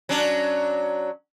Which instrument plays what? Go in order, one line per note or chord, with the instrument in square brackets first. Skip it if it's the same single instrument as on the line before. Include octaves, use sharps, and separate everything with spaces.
[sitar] F#3 C#4 D4